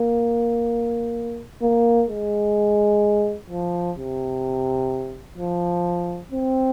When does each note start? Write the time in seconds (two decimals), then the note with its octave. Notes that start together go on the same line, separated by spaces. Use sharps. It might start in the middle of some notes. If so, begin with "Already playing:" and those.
Already playing: A#3
1.62 A#3
2.09 G#3
3.50 F3
3.97 C3
5.37 F3
6.31 C4